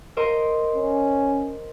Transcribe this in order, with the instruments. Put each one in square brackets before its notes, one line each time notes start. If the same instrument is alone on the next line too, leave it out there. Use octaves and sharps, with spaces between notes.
[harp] A#4 C5 D#5
[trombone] C#4